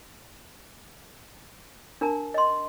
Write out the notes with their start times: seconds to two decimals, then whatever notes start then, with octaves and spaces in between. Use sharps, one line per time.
2.01 D4 A#4 A5 A#5
2.34 D#5 C6